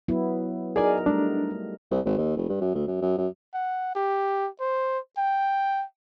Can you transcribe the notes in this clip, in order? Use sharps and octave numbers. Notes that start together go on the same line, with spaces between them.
F#3 B3 E4
D#4 F#4 G#4 A#4 D5 G#5
G3 A3 D4
C2
G#1
D#2
F1
G2
F#2
D2
F#2
F#2
F#2
F#5
G4
C5
G5